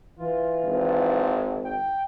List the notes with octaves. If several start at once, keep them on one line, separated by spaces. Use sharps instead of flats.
E3 F4
G#1
G5